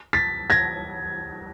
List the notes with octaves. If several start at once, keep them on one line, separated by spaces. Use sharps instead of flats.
A6 B6
G#6 A#6